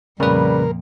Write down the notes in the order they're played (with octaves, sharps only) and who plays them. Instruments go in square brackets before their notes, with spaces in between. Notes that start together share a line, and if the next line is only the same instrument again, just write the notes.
[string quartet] F2 A#2 [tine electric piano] C#3 B4 [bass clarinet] G3 [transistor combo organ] A#4